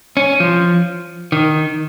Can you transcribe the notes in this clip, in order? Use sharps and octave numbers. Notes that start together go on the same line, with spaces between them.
C#4
F3
D#3